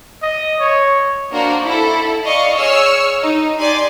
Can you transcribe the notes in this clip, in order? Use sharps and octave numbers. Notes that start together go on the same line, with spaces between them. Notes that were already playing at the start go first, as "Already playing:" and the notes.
D#5
C#5
A#3 D4 F#4 A#4 C5
E4 A4
D5 D#5 F5 C#6
G#4 C#5 E6 F6
D#4
G4 D5 G#5 C6